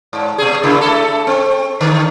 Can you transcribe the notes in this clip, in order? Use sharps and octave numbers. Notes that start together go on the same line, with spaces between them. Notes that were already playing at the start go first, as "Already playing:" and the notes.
G#2
B2 G#4
C#3 A#3 E4
A3 A4
C4
D3